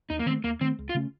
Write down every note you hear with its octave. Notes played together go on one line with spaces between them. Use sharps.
D#2 D#4
A#3
D#3 A3 C4
D#2 A#3
D#3 A3 C4
C#2
F4
C#3 A3 C#4